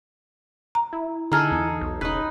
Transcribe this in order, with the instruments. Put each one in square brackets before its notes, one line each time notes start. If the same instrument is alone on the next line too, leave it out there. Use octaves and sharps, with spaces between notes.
[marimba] A#5
[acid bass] E4
[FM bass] D3 [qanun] D#4 G#4 A4 [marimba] A#5 F6
[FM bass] E2
[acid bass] B1
[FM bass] E1 [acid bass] C#3 [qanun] D#4 B4